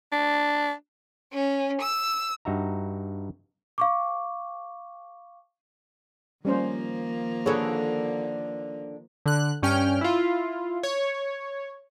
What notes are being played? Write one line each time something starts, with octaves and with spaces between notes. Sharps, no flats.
D4
C#4
E6
G2 D#4 F#4 E5 A#5
F5 C#6 D6
D#3 F3 G3 A#3 C#4 C5
D3 G#4 A4 B4 C#5
D3 F#6
G2 C#4 G5 F6
E4 F4
C#5